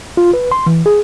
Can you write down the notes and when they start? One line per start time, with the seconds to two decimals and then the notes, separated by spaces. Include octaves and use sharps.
0.17 F4
0.34 B4
0.52 C6
0.66 E3
0.86 G#4